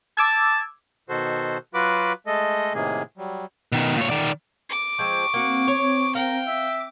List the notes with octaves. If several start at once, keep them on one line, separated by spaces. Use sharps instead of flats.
A5 D6 E6 G#6
B2 D#3 F#4 A4 C5
F#3 F4 F#4 B4 B5 D6
G#3 A3 A4 D#5
A2 C3 D#3 A#3 G#4
F#3 G3
B2 D#3
A#2 C#5
D#3 D5
D6
F3 G#3 C4 C#6
A#3 C4 F#4
C#5
A#4 F5 G5
E5 D6